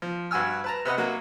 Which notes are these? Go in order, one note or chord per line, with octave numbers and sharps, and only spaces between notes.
F3
G2 F#4 G#5 E6 F6
B4 A5 A#5
C3 B4 D#5 F#5
F#3 A#3 F#4